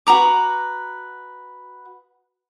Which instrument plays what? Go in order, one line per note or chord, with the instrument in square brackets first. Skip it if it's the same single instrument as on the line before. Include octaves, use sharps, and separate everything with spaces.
[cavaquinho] F#4 B4 A#5 D6